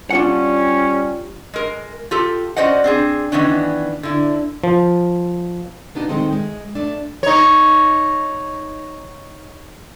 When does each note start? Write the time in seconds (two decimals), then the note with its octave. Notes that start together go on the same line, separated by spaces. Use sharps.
0.11 G3 C#4 D4 F4 F#5
1.54 G#3 A#4
2.11 F4 G4 A4
2.56 C#4 F#4 C5 D5 D#5 F#5
2.84 C4 D4 G#4
3.32 D#3 E3 B3 C#4 D4
4.03 D3 E4
4.64 F3
5.95 A#3 B3 D4 D#4 G4
6.09 D#3 E3 G#3 A3 C4 D#4
6.33 G#3
6.75 A3 D4
7.23 D#4 C#5